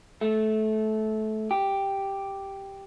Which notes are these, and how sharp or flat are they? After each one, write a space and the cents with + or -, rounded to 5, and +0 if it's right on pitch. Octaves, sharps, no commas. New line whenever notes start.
A3 -20
G4 +0